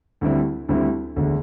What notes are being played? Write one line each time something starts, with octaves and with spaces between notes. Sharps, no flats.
D2 D3 G3 C4 E4
D2 D3 G3 C4 E4
E1 D2 D3